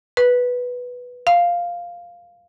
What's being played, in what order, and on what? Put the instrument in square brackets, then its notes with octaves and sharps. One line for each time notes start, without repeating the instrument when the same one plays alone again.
[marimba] B4
F5